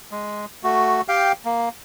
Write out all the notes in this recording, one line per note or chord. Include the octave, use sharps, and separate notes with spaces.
G#3
A3 F#4
G4 F5 G5
A#3